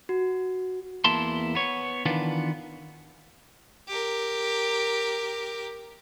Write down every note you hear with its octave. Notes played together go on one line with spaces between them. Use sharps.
F#4
E2 A#3 E4 A5 C6
B3 C#5
D#3 E3 B3 D4 F4
G4 A#4